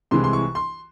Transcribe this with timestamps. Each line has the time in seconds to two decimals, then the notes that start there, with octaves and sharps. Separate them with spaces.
0.11 C2 C3 E3 G#3 C6
0.24 C6
0.33 C#6
0.55 C6